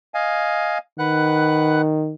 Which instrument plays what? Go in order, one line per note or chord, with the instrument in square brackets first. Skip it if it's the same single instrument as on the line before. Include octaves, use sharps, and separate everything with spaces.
[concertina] D#5 F5 G#5
[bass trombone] D#3 [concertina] B4 F#5 F#6